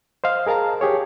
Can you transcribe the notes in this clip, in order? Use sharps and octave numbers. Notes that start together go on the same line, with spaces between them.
C5 D#5 F5
G#4 A#4 F5 A5 A#5
G4 G#4 C#5